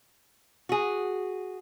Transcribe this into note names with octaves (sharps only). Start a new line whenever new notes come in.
F#4 G#4